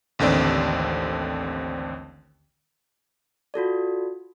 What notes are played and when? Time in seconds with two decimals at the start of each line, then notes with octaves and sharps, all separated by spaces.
0.19 A1 D#2 D3 C4 D5
3.54 F4 F#4 A4 D5